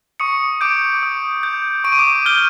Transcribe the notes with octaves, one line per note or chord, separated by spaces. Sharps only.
C#6 D#6 C#7
D6 G6 D7
D#6
G6
C#6 D7
D#7
D6 D7
F6 G6 G7